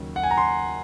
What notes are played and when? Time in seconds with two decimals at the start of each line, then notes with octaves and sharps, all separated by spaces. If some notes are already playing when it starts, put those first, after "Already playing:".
Already playing: D#2 C#3 F#3
0.16 F#5
0.24 G#5
0.31 A#5
0.38 C6